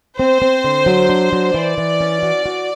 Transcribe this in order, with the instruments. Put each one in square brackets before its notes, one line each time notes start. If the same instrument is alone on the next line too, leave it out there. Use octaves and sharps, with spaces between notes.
[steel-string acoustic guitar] C4 [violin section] C5
[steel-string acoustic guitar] C4
D3
F#3
D4
F#3
[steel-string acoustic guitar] E3 [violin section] D5
[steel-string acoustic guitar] E3
C#4
F#4
F#4